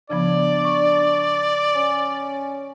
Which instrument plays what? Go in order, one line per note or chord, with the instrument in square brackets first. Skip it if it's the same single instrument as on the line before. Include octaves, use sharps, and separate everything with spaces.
[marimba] C#3 F3 B3 [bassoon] D4 [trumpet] D5
[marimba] C#6
[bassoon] C#4